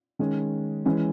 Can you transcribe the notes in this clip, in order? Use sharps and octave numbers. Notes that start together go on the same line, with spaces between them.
D#3 G#3 C#4
E3 G#3 C#4